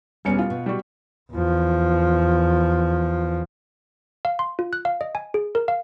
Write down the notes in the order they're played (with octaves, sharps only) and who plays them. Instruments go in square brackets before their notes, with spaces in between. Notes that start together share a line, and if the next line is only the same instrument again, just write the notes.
[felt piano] E1 C#4 C#7 [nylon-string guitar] G3 B3 D4
[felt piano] F4
[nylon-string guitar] B2
[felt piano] G3 F#4
[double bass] E2 F3
[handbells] F5
C6
F4
F#6
F5
D#5
G#5
G#4
A#4
F5